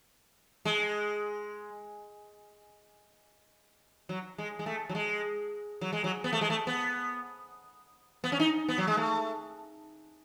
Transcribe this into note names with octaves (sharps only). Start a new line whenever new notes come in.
G#3
F#3
G#3
G#3
A3
F#3
G#3
F#3
G#3
F#3
B3
A3
G#3
A3
B3
B3
C#4
D#4
B3
F#3
G#3
A3